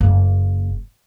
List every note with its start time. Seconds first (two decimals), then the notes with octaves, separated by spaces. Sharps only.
0.01 F#1 A#3